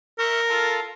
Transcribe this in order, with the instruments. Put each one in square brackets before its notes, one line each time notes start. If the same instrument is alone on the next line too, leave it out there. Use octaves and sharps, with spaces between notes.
[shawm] A#4 [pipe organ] E5 C#6 G6
[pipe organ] F4 A4